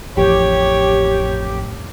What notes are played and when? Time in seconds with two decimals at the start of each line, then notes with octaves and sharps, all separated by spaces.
0.17 A1 F2 G4 C#5